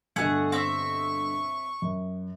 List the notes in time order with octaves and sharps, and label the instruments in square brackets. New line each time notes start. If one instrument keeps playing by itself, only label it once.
[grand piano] G2 B2 D3 [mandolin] A3 G#4 F#5
[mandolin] C4 E5 [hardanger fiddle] C#6
[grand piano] F#2